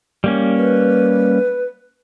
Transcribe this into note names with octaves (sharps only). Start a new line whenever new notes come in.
G3 A#3 C#4
B4